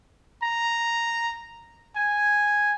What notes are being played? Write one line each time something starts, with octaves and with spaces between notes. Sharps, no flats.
A#5
G#5